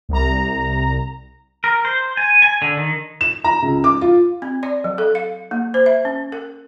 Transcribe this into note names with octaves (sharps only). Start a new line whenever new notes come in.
C2 A#5
A#4
C5
G#5
G#5
D3
D#3
E7
A#5
C#2
D6
F4
C4
D5
F#3
A4
F5
A#3
C5
E5
C#4
A#4